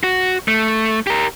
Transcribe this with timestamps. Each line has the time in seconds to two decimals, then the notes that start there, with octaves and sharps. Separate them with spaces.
0.04 F#4
0.48 A3
1.07 G4 A#4